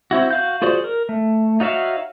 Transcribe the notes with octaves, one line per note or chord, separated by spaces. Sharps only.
C4 E4 F#4
F#4 F5 G6
F4 F#4 G#4 C5 D5
A#4
A3
D#4 F#4 C#5 E5 F5